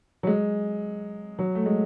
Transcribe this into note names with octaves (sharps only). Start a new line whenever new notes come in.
F#3
G#3
F#3
A3
G#3